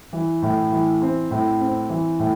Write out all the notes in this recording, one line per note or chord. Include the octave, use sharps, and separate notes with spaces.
E3
A2
E3
C4
A2
C4
E3
A2